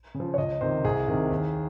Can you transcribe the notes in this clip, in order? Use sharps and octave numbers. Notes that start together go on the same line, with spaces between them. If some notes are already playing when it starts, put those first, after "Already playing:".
C#3
F3
C#5
C#2 D#5
C3 D#3 C5
C2 G#4
C3 D#3
D#2